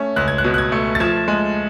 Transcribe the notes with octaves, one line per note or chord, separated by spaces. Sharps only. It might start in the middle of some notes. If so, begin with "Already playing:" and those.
Already playing: A3 C#4
C#2 F#6
G#6
F#6
B2
F#6
G#6
A3
A6
F3 G#6
G#3